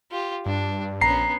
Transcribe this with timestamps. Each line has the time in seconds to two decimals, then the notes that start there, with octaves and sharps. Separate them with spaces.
0.11 F4 G4
0.46 G2 D4
1.01 A#1 B3 C#4 A#5 C7